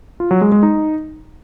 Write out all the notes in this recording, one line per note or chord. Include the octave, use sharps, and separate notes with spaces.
F4
F#3
G#3
G#3
D#4